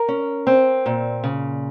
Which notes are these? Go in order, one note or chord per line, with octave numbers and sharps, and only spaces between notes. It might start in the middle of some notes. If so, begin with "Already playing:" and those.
Already playing: A#4 A#5
C#4
C4
A#2
C#3